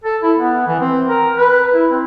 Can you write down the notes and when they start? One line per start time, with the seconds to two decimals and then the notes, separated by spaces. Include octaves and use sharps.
0.04 A4
0.23 E4
0.37 B3
0.67 E3
0.80 C4
1.08 A#4
1.37 B4
1.74 E4
1.91 C4